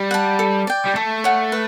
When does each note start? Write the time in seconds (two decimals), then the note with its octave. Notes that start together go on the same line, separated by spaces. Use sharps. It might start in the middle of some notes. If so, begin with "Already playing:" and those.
Already playing: G3
0.11 F#5 A5
0.39 A4
0.67 D5 G5
0.86 G3
0.95 A3 A4
1.24 C#5 F#5
1.52 B4